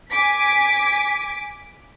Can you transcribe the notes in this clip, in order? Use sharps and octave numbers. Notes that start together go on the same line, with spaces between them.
G#5 D6 B6